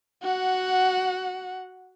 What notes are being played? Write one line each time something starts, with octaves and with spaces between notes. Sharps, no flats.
F#4 F#5